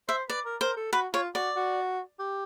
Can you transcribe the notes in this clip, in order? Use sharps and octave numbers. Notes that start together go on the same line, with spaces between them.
C5 E5
B4 D5
A#4
A#4 C5
A4
F#4 B4
F4 C#5
F#4 D5
F#4
G4